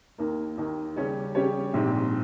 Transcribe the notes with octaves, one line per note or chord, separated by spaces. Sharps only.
D#2 D#3 A#3
D#2 D#3 A#3
C#3 G3 C#4 G4 C#5
C#3 G3 C#4 G4 C#5
A#1 G#2 G3 C4